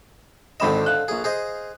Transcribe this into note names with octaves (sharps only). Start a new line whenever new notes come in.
G#1 D3 C4 D#5 B5 E7
F5 F#6
A#1 G#4
G#4 C5 D#5